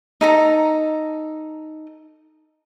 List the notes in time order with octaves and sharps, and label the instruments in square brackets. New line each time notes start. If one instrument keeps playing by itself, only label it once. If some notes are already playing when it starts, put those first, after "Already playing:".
[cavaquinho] D#4 A4 A#5